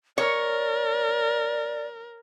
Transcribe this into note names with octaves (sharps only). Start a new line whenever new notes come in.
A#4 C#5 D5